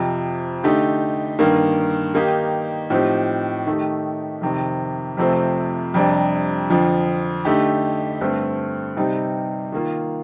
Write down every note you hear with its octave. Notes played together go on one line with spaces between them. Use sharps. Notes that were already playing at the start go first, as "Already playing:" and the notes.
Already playing: F2 C3 F3
D3 A3 D#4 G4
G2 D#3 A#3
D#3 A#3 D#4 G4
A2 F3 C4 D#4 G4
D#3 A3 D#4 G4
F2 C3 D#3
F2 C3 F3 A3 C4
F2 C3 G3 D4
F2 D3 F3
D3 A3 D#4 G4
G2 D3 A3 C4
C3 G3 C4 D#4
D#3 A#3 F4